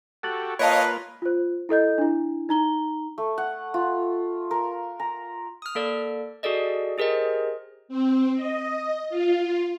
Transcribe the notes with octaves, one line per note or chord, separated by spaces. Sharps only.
F#4 G4 A4 F#6 A6 F#7
A#3 F4 B4 C#5 D#5 F5 A5 D7
F4 C5
E4 A4 D#5 G6
D4 E4
D#4 A#5 G7
A3
F#5
F4
A#4
A#5
D#6 F6
A#3 A4 D5
F#4 G#4 A4 D5 D#5
G4 G#4 A#4 C5 D#5
C4
D#5
F4